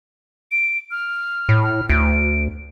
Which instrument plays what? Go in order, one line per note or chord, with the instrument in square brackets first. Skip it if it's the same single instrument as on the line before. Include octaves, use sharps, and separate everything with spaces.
[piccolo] D7
F6
[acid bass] A2
[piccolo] F6
[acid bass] D2 [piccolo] D7